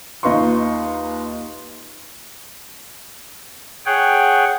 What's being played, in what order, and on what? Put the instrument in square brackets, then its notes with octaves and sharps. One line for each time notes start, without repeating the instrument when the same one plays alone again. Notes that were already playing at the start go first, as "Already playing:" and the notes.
[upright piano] D#2 D#4 F4 B4 C6 C#6
[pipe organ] G#4 C#5 F#5 G5